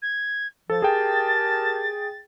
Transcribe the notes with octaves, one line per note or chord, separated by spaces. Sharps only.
G#6
F3 A4 A6
G4 G#4 A#4 G5 A5